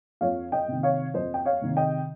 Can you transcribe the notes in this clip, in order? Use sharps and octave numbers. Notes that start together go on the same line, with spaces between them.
F2 C#5 F5
D#5 G5
C3 D#3
C#5 F5
F2 C5 D#5
G5
C#5 F5
C3 D#3
D#5 G5